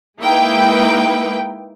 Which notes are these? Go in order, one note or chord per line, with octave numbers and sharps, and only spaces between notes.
G#3 A#3 D#4 E4 B4 G5